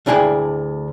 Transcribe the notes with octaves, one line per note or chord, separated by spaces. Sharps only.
D2 D4 E4 G#4 G5